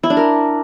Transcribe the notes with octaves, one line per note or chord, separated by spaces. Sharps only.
E4
D4
A#4